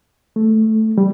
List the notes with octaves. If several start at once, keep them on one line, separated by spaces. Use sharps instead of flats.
A3
G3